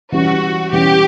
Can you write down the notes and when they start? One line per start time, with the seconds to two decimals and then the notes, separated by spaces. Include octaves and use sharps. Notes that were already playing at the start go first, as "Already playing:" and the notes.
0.12 E3 G3 C#4 F#4
0.72 E3 G3 C#4 G4